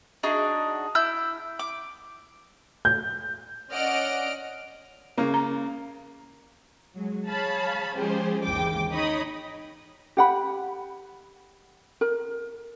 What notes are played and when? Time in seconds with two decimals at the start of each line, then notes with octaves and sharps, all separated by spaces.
0.23 D4 D#4 F#4 G#4
0.95 E4 E6 G6
1.59 D6
2.85 G6
3.70 C#4 D5 D#5 F#5 F6 D7
5.18 C#3 A#3
5.34 A#5
6.95 F#3 G#3
7.28 G#4 C#5 F5 A5 B5
7.96 F3 G#3 C#4 G4 G#4 C5
8.44 G#1 D#2 C#3 E3 G5 D6
8.92 D#4 C#5 D#5 B5 D#6
10.17 G4 F#5 B5
12.01 A#4